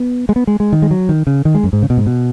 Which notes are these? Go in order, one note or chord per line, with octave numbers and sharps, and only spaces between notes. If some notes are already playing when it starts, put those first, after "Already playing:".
Already playing: B3
G#3
B3
G#3
G#3
D#3
G#3
F#3
D#3
C#3
D#3
G#3
F#2
G#2
C#3
B2
G#2
B2